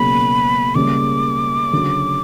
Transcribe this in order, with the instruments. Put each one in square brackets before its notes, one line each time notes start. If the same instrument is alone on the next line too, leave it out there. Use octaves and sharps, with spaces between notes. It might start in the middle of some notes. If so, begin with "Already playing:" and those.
Already playing: [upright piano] C#2 B2 F#3 A#3 [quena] B5
[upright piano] C#2 C#3 G3 A#3 [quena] D6
[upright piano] D2 C#3 F#3